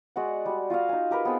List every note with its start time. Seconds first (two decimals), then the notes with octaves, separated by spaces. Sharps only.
0.16 G#3 F#4 D5 F#5
0.46 G3 F#4
0.70 F4 F#4 D#5 F5
0.89 D#4 G#5
1.11 G4 A#4 B4
1.25 B3 C4 G#4 A4